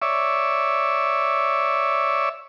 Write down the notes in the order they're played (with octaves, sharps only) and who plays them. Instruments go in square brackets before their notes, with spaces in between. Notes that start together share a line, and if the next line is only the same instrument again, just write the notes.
[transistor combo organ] C#5 D5 E5